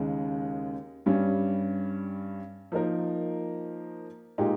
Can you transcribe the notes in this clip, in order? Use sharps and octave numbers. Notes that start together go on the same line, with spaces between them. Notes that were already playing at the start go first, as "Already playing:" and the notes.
Already playing: D#2 C#3 G#3 D#4
G2 G3 C#4
F3 A#3 D#4 A#4
A#2 G#3 D#4 G4